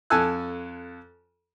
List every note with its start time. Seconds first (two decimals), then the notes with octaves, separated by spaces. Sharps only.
0.10 F2 A4 G#5 A5 E6 F#6